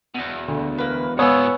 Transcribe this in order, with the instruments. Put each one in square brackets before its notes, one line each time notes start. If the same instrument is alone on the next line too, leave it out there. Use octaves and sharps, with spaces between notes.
[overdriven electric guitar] E2 B2
[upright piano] D2
[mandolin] A#3 B4
[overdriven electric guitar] G#2 F4 [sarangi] B3 [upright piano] C#5 G#5 [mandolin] D#6 E6